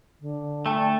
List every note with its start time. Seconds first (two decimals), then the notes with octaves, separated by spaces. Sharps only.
0.21 D3
0.66 A3 G5 A5